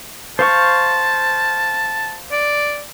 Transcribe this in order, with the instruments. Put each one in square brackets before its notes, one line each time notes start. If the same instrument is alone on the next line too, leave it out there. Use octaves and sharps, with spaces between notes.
[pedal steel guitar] C5 F5 C#6 [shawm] A5
[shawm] D5